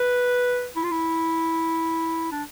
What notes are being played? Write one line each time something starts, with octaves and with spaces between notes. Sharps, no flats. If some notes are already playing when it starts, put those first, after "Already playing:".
Already playing: B4
E4
F4
E4
D4